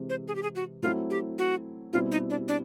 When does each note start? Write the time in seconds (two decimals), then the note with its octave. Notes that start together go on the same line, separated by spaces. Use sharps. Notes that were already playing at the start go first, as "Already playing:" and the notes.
Already playing: C3 E3 G#3 C4
0.10 C5
0.28 G#4
0.35 G4
0.43 G#4
0.55 F#4
0.83 F#3 A3 C4 E4 F4
1.10 G4
1.38 F#4
1.93 B2 G3 C4 E4 F4
2.12 D#4
2.30 D4
2.48 D4